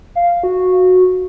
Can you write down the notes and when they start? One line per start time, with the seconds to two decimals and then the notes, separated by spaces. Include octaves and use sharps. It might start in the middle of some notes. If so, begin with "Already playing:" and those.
0.15 F5
0.43 F#4